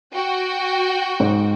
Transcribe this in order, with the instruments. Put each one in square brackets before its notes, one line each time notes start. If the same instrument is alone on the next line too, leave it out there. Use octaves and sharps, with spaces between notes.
[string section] F#4 G5
[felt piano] G#2